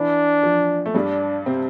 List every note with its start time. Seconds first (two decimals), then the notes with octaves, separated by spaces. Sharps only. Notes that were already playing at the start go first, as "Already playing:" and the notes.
Already playing: E3 D4
0.43 F3
0.86 A3
0.94 G2 G3 D4
1.46 C3 C4